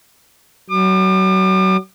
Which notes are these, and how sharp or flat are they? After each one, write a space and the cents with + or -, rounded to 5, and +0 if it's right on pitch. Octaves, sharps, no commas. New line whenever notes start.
F#3 +30 D6 +40